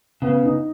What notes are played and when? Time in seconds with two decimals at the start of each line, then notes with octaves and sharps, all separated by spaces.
0.22 C#3 B3
0.45 D#4